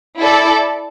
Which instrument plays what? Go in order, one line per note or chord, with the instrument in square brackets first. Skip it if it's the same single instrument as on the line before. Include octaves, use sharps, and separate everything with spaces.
[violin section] E4 A4 D5